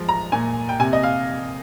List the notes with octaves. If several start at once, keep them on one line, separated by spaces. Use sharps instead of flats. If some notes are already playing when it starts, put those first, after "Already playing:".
Already playing: F3 G#3
A#5
A#2 G#5
G5
C3 G#5
D#5
F5